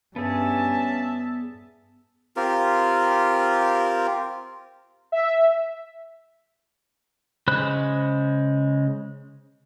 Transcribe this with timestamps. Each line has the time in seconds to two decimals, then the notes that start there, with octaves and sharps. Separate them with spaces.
0.16 G2 B3 C#4 G#4 E5 A5
2.36 C4 F4 G4 A#4
5.12 E5
7.48 C#3 G#3 C5 B5 F#6